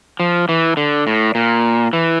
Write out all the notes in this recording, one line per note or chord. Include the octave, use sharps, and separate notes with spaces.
F3
E3
D3
A2
A#2
E3